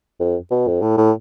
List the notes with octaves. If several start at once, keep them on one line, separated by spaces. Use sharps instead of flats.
F2
B2
F2
A2
A2